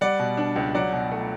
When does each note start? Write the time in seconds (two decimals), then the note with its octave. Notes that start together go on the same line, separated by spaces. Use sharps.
0.01 G3 D5 F#5
0.19 B2
0.37 D4
0.56 C#2
0.75 F#3 D5 F#5
0.93 B2
1.12 A3